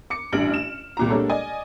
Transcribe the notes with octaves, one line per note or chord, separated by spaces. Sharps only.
D6 C#7
A1 G2 D4 F6 D7 F#7
E7
C2 A#2 A#5
G3 G#3 A#3 D4 A4 C#5
D5 D#5 G#5